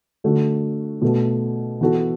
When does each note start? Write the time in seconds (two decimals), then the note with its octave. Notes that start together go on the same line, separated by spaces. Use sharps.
0.24 D3 A3 F#4
1.02 B2 A3 F#4
1.81 E3 B3 F#4 A4